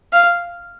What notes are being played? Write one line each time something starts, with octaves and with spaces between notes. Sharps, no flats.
F5